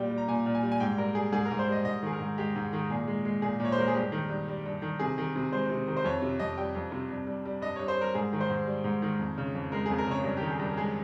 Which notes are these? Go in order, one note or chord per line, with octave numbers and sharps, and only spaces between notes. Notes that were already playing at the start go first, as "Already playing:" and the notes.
Already playing: A#2 G3 G5
G3
A#5
A#2 G#5
A#2
G#5
G3
G#5
G#2 G5
G3 A#4
G3 G#4
G#2 G#4
A#4
G#2
C5
G3 D#5
G#2 D#5
D#3 G#4
A#4
G#2
G#3 G4
G#2
D#3
A#2 G#4
G#3
G#3
A#2 G#4
A#2
C#5
C5
G#3 A#4
G#4
G2 G4
D#3
G2
G3
G2
D#3
C3 G#4
D#3
C3
G#3 C5
C3
D#3
C5
F2 C#5
C3
F2 D#5
G3 G5
F2
C3
G2
G3
G3
G2 D#5
G2 C#5
C5
G3 A#4
G#2 G#4
D#3
C5
G#2
G3
G#2
D#3
F2
C#3
F2
G#3 A#4
F2 G#4
A#4
C#3 C#5
G2 A#4
D#3 G4
G#4
G2 A#4
G#3 G#4